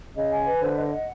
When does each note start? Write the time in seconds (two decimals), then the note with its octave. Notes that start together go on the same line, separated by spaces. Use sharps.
0.16 C#3 D#5
0.31 G#5
0.46 B4
0.61 D3 C5
0.76 D#5
0.91 F#5